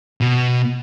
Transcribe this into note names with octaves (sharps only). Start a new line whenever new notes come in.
B2